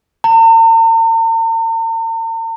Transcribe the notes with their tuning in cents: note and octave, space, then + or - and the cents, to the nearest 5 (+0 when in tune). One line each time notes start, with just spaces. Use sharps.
A#5 -45